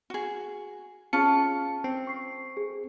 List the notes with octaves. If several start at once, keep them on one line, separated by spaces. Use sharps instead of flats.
F#4 G#4
C#4 F4 G#4 A5 C#7
C4
C#6 C7
G#4